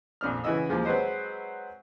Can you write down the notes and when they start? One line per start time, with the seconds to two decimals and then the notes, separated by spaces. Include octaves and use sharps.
0.21 A#1 F2 D4 F6
0.44 C#3 E3 E4 F#4 D#5 E6
0.69 D#2 F3 G#3
0.85 F#3 G#3 C4 B4 C5 D#5